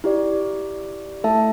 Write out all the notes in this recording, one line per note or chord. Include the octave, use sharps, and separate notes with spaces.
E4 G4 D5
A3 E4 A4 E5 A5